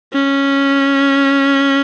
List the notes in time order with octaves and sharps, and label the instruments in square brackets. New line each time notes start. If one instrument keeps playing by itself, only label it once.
[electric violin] C#4